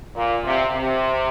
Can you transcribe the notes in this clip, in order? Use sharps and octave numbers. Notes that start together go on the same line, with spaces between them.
A#2
C3
C3